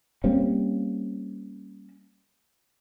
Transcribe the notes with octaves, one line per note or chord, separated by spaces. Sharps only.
G3 A#3 C4 C#4